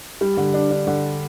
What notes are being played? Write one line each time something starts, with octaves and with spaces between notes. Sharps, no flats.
G3
D3
D4
D4
D3